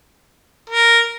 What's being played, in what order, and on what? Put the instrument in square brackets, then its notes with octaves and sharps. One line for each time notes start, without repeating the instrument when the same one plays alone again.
[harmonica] A#4